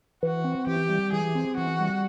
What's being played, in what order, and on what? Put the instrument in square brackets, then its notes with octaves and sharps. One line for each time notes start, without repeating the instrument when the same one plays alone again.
[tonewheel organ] E3 [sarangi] F#4
[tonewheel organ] C4
[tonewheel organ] E3 [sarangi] G4
[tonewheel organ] G3
[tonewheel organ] E3 [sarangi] G#4
[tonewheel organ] C4
[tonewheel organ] E3 [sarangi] F#4
[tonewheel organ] G3